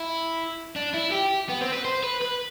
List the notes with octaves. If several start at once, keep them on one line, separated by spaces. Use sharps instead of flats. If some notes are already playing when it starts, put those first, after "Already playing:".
Already playing: E4
D4
E4
G4
B3
C4
B4
C5
B4
B4